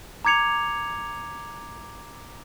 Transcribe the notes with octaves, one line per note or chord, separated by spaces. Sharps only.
A#5 D6 G#6 C#7 F7